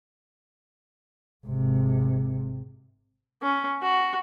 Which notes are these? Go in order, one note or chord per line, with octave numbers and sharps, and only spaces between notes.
G#1 C3
C#4
F#4